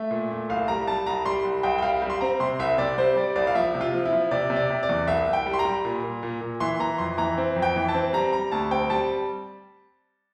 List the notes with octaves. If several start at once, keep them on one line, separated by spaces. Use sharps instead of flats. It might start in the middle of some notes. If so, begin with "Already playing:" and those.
Already playing: A3 E5
A#2
A3
C2 F5
G3 A#5
G3 A5
C2 A#5
G3 C6
C2
C2 G5
G5
G3 F5
G3
C6
C4 A#5
C3 C6
C2 E5
C3 D5
G3 C5
G3 D5
C2 D5
F5
F3 E5
C3
F4
F3
E4
F3
C3 D5
C3
D5
C3
D5
E2
C2 E5
C2
G5
G3
C6
A#5
G3
A#2
A#2
A#2
A#2
E3 C6
E3 A#5
F2 C6
E3 A#5
C4
F2
G5
E3
A5
C4
G3 A#5
G3 A#5
D2 A5
C4 G5
G3 A5